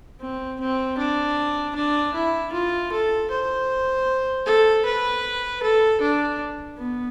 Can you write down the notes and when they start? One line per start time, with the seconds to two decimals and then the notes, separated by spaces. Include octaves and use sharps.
0.20 C4
0.60 C4
0.98 D4
1.75 D4
2.14 E4
2.53 F4
2.92 A4
3.31 C5
4.46 A4
4.86 B4
5.63 A4
6.01 D4
6.78 B3